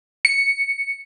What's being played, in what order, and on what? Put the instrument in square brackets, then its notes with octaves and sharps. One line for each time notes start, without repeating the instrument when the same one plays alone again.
[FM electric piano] C#7